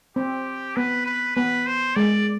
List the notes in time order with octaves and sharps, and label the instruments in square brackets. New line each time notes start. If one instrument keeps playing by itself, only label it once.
[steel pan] C4 [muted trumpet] G4
[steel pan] B3 [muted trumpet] B4
[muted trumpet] B4
[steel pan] B3 [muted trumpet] B4
[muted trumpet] C5
[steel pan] G#3 [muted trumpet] D5